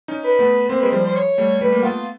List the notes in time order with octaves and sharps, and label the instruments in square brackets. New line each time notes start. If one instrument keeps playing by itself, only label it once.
[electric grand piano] C#4 D#4
[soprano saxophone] B4
[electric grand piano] A3 B3
[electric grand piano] A#3 C4 [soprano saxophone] C5
[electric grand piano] G#3 [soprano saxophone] B4
[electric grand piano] F3 G3 [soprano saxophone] C5
[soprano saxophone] C5
C#5
[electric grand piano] G3 A3
[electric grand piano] G3 A3 [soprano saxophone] B4
[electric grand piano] A#3
[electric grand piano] A3 B3 [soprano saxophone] F4